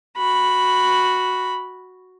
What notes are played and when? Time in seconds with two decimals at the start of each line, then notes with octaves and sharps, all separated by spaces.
0.17 F#4 B5